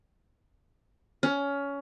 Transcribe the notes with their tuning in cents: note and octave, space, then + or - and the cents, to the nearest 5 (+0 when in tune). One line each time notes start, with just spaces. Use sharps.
C#4 +20